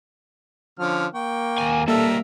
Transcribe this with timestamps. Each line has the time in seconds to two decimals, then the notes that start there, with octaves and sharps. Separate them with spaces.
0.79 D3 F3 C#4 F6
1.15 A#3 G5 C#6
1.58 D#2 G#5
1.88 G3 A#3 A4 A#4 E5